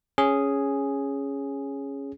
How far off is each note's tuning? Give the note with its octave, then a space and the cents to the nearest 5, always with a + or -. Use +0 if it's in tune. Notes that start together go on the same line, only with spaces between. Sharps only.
C#4 +0 G#4 +0